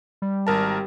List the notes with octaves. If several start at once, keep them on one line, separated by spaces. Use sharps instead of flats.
G3
G#1 A#4 A5